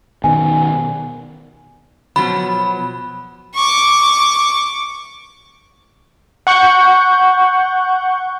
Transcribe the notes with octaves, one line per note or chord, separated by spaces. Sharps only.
B2 D#3 G#5
B2 F3 F#3 B5
C#6 D6
F#5 C#6 G6